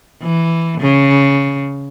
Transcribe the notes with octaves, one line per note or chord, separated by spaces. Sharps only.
E3
C#3